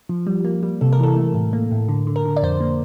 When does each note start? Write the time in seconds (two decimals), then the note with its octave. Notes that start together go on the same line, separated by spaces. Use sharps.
0.09 F3
0.27 G3
0.45 A#3
0.63 G3
0.81 C3 A4
0.93 A#4
0.99 E3 A4
1.17 A3
1.34 A2
1.53 A#3
1.71 A2
1.88 D3
2.07 D3
2.16 A#4
2.25 D3
2.36 D5
2.42 F2 C5
2.61 A#3